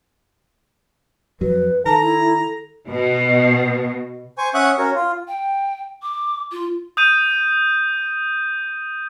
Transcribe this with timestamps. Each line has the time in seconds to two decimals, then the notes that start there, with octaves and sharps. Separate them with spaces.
1.41 F2 F#3 B4
1.86 D#3 A4 A5 A#5
2.03 E4
2.89 B2
4.38 C5 G#5 C#6
4.54 C#4 E5 F#5 C#6 D#6 F#6
4.78 C#4 F#4 A#4 C#5
4.95 F4
5.28 G5
6.02 D6
6.52 F4
6.97 D#6 G6 D#7